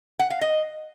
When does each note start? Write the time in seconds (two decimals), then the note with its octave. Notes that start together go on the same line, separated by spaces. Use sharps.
0.19 F#5
0.30 F5
0.41 D#5